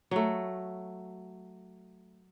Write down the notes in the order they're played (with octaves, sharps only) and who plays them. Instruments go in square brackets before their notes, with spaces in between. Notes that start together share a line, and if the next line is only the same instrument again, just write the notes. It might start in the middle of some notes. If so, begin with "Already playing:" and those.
[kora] F#3 A3